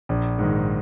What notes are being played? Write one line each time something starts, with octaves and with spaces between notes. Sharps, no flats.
A#1
G#2 D#3